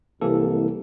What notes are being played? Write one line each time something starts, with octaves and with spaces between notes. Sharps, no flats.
C2 E3 A#3 A4